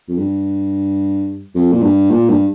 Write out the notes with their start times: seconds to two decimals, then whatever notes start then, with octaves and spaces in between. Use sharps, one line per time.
0.09 F2
0.18 G2
1.55 F2
1.73 A#2
1.83 G2
2.11 A#2
2.30 G2